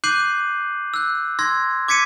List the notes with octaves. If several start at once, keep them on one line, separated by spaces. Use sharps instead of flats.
D6 F#6 G6 C7 D#7 F#7
E6 F#6
C6 E6 G#6 A#6
D6 G#6 B6 C#7 D#7